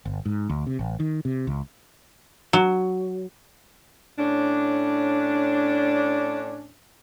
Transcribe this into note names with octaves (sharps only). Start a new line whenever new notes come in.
G1
G#2
D2
C3
A1
D#3
C3
C#2
F#3
A2 C#4 D4